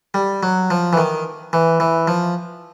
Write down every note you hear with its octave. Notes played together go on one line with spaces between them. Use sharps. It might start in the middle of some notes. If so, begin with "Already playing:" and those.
G3
F#3
F3
E3
D#3
E3
E3
F3